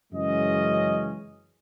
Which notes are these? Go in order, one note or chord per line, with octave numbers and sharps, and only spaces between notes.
F#2 C#3 E3 G#3 C#4 D#5